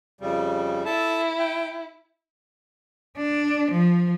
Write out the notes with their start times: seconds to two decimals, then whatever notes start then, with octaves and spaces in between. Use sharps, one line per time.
0.21 F2 C#3 G3
0.86 E4 A4 A5
1.39 G5
3.17 D4
3.71 F3